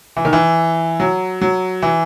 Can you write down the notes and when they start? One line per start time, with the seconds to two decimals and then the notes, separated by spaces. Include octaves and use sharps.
0.17 E3
0.25 D#3
0.33 E3
1.00 F#3
1.42 F#3
1.82 E3